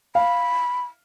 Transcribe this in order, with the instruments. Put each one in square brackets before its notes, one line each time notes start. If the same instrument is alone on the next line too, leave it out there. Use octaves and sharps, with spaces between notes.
[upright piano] F5 [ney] B5